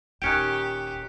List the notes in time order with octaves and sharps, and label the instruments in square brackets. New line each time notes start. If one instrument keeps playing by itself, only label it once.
[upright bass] D#1 [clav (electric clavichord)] D#3 C#4 G5 [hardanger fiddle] G4 [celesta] F#6 C#7 D7